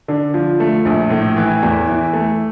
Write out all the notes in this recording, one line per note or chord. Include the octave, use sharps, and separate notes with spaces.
D3
F3
A3
A#1
A2
E3
E2
E3
A3